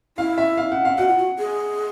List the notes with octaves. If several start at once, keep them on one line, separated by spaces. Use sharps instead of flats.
E4 F5
E5
F5
F#5
F5
F#4 F#5
F4
F#4
G#4